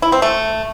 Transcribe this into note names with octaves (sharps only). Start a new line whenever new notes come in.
E4
C4
A3